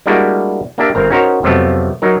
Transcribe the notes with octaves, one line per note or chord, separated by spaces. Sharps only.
G3 G#3 A#3 D4 E4 F#4
A#3 D4 G4 E5
G1 C4 A#4 A#5
C#4 D#4 F#4 A#4 C5 C#5
F2 C3 F3 F#3 A3 B3
F#3 D#4 A#4